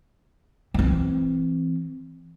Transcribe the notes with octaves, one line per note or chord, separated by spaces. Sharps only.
E3 C4